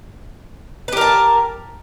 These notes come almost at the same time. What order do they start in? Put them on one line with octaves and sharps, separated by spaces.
B4 G4 A#4 A5